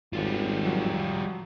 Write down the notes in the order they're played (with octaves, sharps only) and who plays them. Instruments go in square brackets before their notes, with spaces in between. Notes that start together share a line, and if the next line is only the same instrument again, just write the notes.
[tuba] G#1 [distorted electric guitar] G3 F4
[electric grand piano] F3 F#3